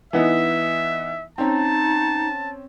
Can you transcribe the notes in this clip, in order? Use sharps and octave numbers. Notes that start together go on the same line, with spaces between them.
E3 B3 D#4 E5
C4 C#4 D#4 A5